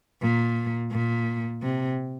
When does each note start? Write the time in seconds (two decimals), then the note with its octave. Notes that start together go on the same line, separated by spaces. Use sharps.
0.22 A#2
0.92 A#2
1.62 C3